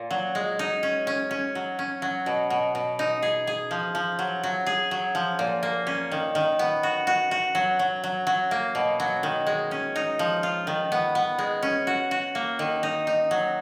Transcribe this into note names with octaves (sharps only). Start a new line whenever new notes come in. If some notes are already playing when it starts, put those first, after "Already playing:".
Already playing: A#2
F#3
G#3
D#4
C#4
C#4
C#4
F#3
C#4
F#3
B2
B2
B2
D#4
G#4
G#4
F3
F3
F#3
F#3
G#4
F#3
F3
A#2
A#3
C#4
D#3
D#3
B3
F#4
F#4
F#4
F#3
F#3
F#3
F#3
A#3
B2
F#3
D#3
G#3
C#4
D#4
F3
F4
D#3
B3
B3
G#3
C#4
F#4
F#4
A#3
D#3
D#4
D#4
F#3